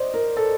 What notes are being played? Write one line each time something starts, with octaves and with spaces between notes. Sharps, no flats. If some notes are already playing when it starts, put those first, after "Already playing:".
Already playing: C5 D5 D#5
A#4
A4